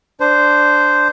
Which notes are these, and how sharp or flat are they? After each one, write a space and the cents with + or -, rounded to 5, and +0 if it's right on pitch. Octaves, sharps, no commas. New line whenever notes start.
D4 +0 C5 -10